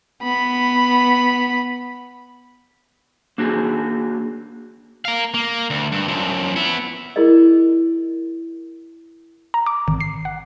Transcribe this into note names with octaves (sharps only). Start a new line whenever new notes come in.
B3 B5
A#3 D4 F#4 G#4
A#4 F5
A#3
D2
G2
F#2 F3
B3 E4
E4 G#4 A#4 D5 D#5
A#5
D6
G#1
C7
F#5